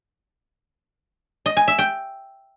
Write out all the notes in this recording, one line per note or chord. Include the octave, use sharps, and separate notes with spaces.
D#5
G#5
E5
G5